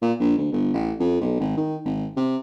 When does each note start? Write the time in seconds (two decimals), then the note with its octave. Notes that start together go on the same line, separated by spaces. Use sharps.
0.02 A#2
0.20 A#1
0.37 D2
0.52 G1
0.74 A1
1.00 F2
1.21 B1
1.40 G#1
1.57 D#3
1.85 G#1
2.17 C3